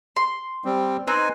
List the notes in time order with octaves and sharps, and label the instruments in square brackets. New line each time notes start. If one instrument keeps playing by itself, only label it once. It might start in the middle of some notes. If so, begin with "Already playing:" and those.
[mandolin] C6
[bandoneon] G3 C4
[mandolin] C4 D#4 [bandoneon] B4 G#5